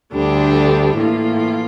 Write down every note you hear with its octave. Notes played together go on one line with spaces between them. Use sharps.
D2 D3 G3 D4 G4
A2 E3 A#3 F4